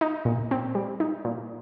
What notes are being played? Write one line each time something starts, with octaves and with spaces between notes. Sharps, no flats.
D#4
A#2
C4
G3
D#4
A#2